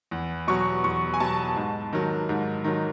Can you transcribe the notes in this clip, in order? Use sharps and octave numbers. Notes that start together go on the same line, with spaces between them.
E2
B2 F#3 C#6
E2 C#6
G#5
B2 F#3 A5
G#2
D#3 F#3
G#2
D#3 F#3